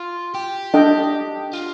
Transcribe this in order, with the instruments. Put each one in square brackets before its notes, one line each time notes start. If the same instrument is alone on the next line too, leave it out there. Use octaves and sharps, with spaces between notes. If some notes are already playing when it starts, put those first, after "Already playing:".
Already playing: [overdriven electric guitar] F4
G4
[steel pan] D4 A4 D#5 G5
[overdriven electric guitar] F4